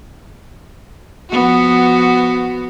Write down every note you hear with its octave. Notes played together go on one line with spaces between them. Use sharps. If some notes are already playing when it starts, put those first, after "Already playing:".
F3 B3 F#4